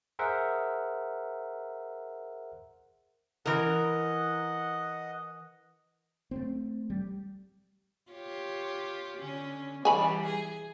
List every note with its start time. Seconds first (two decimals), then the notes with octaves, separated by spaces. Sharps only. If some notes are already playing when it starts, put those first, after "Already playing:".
0.19 G#4 A#4 C5 E5 F#5
3.46 E3 A#4 D#5 F#5
6.31 A3 A#3 C4
6.90 G3
8.11 F4 G4 C#5
9.18 D3 C#4
9.85 E3 G3 G#5 B5
10.27 G#4